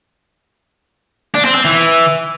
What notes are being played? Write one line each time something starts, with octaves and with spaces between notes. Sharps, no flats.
D4
C4
C4
E3